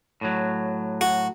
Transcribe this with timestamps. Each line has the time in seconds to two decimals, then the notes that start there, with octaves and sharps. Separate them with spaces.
0.21 A2 F#3
1.01 F#4